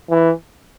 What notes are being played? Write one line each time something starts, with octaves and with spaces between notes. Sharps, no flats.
E3